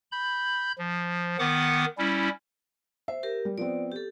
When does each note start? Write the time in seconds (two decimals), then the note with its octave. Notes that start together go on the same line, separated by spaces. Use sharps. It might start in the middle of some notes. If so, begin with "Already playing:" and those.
0.12 B5 G6
0.79 F3
1.39 D#3 B3 F#5 D6
1.98 G3 C#4 E4
3.08 C5 E5
3.23 G4 A#4
3.45 G3
3.58 F3 B3 C4 D5
3.91 G4 A4